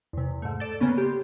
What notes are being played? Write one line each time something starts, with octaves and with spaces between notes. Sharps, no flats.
E2 C3
G#2 A3
A4 D5 E7
C#3 A#3 B3 C#4
G4 C6